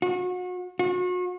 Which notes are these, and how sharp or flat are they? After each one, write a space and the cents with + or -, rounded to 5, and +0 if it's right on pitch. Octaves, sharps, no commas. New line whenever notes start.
F#4 -35
F#4 -40